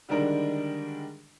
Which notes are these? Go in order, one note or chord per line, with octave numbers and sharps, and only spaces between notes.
D3 D#3 G3 G#3 D4 A#4